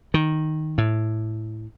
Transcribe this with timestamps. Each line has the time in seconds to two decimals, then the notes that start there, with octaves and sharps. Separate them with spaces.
0.14 D#3
0.78 A2